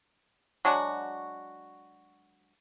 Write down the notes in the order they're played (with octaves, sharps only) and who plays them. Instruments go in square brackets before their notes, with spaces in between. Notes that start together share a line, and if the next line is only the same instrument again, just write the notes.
[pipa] F#3 G#3 D4 F#4